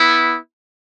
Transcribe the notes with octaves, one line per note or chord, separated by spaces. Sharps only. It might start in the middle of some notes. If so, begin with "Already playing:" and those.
Already playing: B3 E4